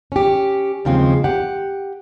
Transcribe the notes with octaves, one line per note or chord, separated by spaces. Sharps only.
C#4 G4
D#2 C#3 F3 G#3 C4
G4 F#5